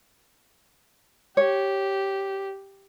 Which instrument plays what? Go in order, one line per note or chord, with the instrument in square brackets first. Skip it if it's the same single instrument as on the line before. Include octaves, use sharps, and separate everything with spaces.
[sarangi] G4 [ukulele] C#5